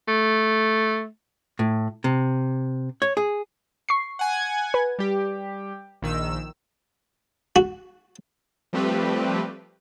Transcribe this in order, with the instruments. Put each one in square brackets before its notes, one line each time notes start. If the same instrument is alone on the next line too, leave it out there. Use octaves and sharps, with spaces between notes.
[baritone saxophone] A3
[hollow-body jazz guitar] A2
C3
C#5
G#4
[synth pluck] C#6 C7
[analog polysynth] F#5 G#5 G#6
[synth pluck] B4
[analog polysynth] G3 G4
A#1 D#3 E6
[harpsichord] F#4
[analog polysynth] F3 G3 A3 C4 G4 B4